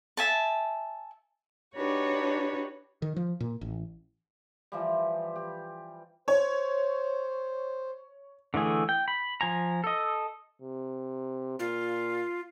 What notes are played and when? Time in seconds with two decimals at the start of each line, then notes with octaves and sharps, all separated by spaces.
0.17 E5 G#5 A5
1.75 D4 D#4 F#4 G4 B4 C#5
3.02 D#3
3.16 F3
3.40 A#2
3.61 A1
4.72 E3 F3 G3
5.36 G4
6.28 C5 C#5
8.54 D3 E3 A3 G#4
8.89 G5
9.08 B5
9.41 F3 G#5 A#5
9.84 A4 D#5
10.61 C3
11.59 A#2 F4